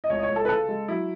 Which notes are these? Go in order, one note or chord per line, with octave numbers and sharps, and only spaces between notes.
D#5
C#2 C#5
D#5
C#5
C#2
A4
B4
C#3 A4
G#3
F#3 E4